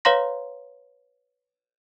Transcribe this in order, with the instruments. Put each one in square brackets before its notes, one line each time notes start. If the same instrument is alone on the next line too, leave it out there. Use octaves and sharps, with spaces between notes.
[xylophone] B4 C#5 F5 A#5 C6 A#6